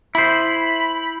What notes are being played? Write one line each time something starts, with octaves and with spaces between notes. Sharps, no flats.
E4 C5 B5